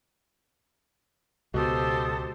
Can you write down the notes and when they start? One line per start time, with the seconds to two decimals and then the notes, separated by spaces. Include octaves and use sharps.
1.54 C#2 B2 G4 A4 C5 D#6